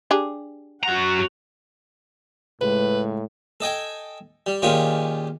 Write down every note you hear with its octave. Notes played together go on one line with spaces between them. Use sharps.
D4 G4 G#4
F#2 F#4 F#5 A#5
C#2 A2 B4
A4 D#5 G5 G#5
G3
A#2 D#3 G#3 C#4 F4 G4